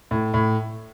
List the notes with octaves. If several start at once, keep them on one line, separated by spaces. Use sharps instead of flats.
A2
A2